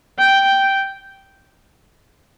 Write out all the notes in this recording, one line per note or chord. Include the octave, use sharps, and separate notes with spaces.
G5